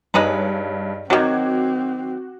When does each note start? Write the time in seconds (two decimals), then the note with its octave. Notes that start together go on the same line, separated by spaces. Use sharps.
0.14 G2 G#3 D#4 B4 C#5
1.10 D#3 F#3 C4 F#4 D6 G#6